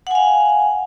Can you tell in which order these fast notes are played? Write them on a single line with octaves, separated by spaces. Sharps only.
F#5 G#5 F5